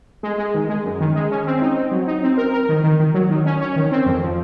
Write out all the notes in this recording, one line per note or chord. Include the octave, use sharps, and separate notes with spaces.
G#3
G#3
D#3
G#3
F#2
D#3
G#3
C#4
C4
D#4
C4
F#3
D#4
C4
A#4
A#4
D#3
D#3
D#3
F#3
D#3
C#4
C#4
D#3
C4
F2
F3